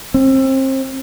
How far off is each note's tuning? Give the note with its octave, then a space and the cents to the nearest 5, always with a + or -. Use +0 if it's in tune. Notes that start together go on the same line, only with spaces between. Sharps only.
C4 +30